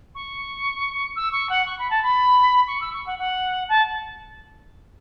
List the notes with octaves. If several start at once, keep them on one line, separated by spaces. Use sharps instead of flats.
C#6
E6
C#6
F#5
C#6
B5
A5
B5
C#6
E6
C#6
F#5
F#5
A5